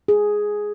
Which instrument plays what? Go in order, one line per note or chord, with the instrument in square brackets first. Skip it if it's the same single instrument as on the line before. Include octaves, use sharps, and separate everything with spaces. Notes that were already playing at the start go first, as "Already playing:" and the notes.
[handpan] G#4